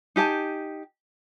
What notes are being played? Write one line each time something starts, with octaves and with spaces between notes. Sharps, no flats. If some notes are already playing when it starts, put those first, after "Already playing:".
D#4 G4 G#5 A5